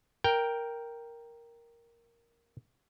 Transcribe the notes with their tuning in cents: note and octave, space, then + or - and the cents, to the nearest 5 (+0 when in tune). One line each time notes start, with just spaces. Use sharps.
A#4 +0 G5 +0